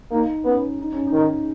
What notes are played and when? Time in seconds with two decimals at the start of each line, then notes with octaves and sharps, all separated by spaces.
0.10 A#3 D#4
0.44 B3 C#4
0.79 D#4
0.92 C#4
1.07 D#4
1.13 D#3